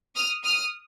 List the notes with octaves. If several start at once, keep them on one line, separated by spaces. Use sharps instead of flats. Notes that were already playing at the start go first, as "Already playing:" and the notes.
D#6 F6
D#6 F6